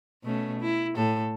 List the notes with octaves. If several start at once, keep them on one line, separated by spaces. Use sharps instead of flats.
B2 A3 C#4
E4
A2 A4